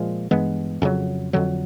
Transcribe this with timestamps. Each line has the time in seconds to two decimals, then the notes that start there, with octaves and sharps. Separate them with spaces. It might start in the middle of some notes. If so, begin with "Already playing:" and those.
Already playing: A#2 F3 G#3
0.31 G2 E3 G#3 B3
0.82 F2 C#3 F#3
1.33 F2 D3 F#3